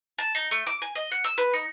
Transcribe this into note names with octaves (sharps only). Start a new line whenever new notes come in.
A5
D#4
A3
D6
G#5
D#5
F#5
E6
B4
D#4